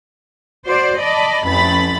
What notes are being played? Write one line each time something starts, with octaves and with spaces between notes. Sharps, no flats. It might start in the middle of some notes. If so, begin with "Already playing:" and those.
F#4 C5 D5
D5 D#5 A5 B5
A1 F2 B5 A6